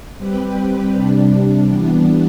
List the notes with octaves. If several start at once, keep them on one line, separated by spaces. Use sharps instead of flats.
G3 C4 G4 B4
C3 G3 D4
E3 G3 B3 D4